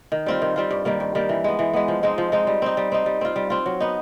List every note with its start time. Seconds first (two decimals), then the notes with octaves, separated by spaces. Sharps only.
0.12 D#3
0.26 G3 C4 F4
0.42 D#3
0.56 G3 C4 F4
0.71 G2
0.85 D#3 G3 A#3
1.00 G2
1.15 D#3 G3 A#3
1.29 E3
1.44 G#3 B3
1.59 E3
1.73 G#3 B3
1.88 F3
2.03 G#3 C4 D#4
2.18 F3
2.32 G#3 C4 D#4
2.47 G3
2.62 C4 D#4
2.77 G3
2.92 C4 D#4
3.06 G3
3.21 C4 F4
3.36 G3
3.50 C4 F4
3.66 F#3
3.80 B3 D#4